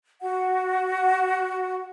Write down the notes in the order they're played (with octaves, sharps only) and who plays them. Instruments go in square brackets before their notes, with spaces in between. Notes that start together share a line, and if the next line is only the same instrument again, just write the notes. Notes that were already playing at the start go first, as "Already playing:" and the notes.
[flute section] F#4 F#5